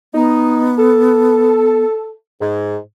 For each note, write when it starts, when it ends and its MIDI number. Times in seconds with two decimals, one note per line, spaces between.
0.14 1.84 59
0.14 0.69 63
0.78 2.13 69
2.41 2.76 44